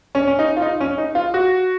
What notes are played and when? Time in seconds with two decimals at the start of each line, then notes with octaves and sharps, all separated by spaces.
0.15 C#4
0.28 C#4
0.39 D#4
0.57 F4
0.62 D#4
0.80 C#4
0.98 D#4
1.15 F4
1.34 F#4